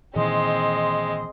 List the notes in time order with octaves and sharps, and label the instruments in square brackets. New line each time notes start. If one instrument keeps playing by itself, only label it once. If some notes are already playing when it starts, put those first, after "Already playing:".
[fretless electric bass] A#2 D#3 E3 [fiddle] G#3 C4 [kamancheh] D#5 C6